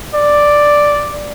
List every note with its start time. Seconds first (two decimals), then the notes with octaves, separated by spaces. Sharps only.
0.15 D5